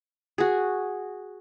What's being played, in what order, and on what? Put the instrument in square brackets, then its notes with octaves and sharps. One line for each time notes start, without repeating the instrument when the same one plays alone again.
[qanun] F#4 G#4